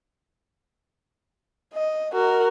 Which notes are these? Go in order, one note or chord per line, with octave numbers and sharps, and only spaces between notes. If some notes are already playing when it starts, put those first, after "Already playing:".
D#5
F#4 A#4